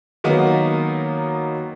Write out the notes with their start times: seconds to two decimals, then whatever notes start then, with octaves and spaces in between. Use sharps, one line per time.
0.24 D#3 F#3 A#3 B3 D#4